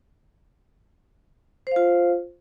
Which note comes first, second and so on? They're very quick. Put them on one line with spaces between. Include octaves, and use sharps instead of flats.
C5 F5 F4